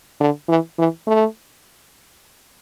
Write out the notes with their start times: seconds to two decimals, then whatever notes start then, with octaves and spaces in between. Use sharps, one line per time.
0.20 D3
0.49 E3
0.79 E3
1.07 A3